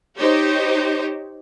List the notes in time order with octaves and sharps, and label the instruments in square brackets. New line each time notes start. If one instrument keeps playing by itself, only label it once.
[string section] D#4 G4 C5 C#5